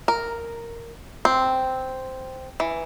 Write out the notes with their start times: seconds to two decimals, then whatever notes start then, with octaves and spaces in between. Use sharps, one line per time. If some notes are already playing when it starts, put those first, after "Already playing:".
0.08 A#4
1.25 C4
2.60 E3